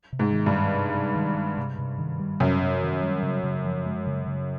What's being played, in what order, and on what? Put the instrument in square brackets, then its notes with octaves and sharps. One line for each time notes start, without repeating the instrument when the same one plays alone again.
[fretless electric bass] C3
[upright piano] G#2
[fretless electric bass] D#3
[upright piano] G2
[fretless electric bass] G3
C3
C3
D#3
G3
C3
C3
D#3
G3
[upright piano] F#2 [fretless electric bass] C3
[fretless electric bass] C3
D#3
G3
C#3
C#3
F3
G#3
C#3
C#3